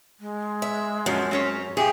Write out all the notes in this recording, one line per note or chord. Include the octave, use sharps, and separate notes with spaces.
G#3
E5
F#2 F3 C#4
C4 C#4 C#5
G2 G4 G#4 E5